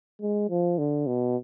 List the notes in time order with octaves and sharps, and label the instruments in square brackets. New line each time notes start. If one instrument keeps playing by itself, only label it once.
[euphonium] G#3
F3
D3
B2